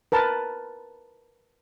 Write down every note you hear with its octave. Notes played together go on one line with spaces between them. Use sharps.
A#4 B4 A5